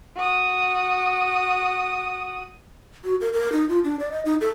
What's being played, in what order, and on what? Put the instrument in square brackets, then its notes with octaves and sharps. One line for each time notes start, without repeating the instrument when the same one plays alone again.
[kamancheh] F#4 D#6
[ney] F#4
A#4
A#4
D#4
F4
D4
D5
D#5
D#4
A4